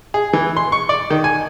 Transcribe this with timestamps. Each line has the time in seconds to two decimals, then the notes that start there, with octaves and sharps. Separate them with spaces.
0.14 G#4
0.33 E3
0.57 C6
0.72 C#6
0.89 D5
1.10 D#3
1.24 G#5